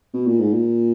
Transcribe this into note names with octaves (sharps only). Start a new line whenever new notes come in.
B2
A#2
G#2
A#2